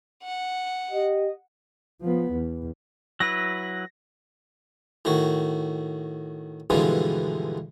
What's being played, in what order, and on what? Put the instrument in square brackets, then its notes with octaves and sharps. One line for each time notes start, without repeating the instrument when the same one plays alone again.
[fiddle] F#5
[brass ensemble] G4 D#5
[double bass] F3 B3
E2
[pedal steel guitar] F#3 E4 B4 [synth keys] A#6
[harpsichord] A2 D#3 F#4
G2 B2 D3 E3 F3 G#3